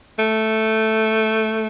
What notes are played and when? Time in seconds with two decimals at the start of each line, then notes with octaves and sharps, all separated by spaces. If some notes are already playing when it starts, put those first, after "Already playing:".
0.19 A3